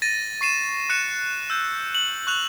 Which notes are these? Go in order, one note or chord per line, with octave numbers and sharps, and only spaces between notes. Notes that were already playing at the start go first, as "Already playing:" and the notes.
A6 A#6 D#7
C#6 C7 D#7 E7
C#6 F#6 C#7 D#7 E7
E6 G6
F#7
C#6 F#6 F7